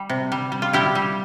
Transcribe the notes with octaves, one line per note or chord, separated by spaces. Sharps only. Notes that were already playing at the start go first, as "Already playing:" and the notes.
Already playing: G3
C3
G3
G3
F4
G3 E4 G4
G3